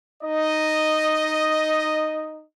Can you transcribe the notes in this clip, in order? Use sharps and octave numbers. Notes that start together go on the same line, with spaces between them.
D#4 D#5